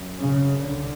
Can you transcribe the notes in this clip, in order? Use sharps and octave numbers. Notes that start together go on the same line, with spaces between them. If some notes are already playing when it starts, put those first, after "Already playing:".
Already playing: F#2
C#3
C2 D3